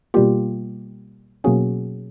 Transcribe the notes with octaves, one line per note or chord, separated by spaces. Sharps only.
B2 G3 A#3 F4 G4
B2 F#3 A#3 C#4 F#4 G#4